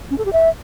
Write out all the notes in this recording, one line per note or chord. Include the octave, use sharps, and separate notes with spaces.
C#4
A4
G4
E5